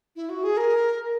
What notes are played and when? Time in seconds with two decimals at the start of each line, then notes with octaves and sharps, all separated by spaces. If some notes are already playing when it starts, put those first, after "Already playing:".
0.16 E4
0.29 F#4
0.43 G#4
0.57 A#4